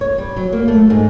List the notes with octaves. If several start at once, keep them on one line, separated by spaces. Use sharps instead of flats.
C#5
G3
F#3
A#3
A3
G#2